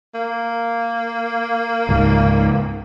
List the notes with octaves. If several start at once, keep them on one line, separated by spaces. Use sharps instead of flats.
A#3
C#2 G#2